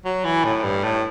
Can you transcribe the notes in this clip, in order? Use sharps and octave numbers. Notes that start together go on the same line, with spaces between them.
F#3
E3
A2
G2
A2